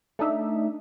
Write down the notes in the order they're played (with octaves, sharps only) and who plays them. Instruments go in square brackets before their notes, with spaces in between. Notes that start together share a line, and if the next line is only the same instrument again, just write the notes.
[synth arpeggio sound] A3 D4 D#4 E5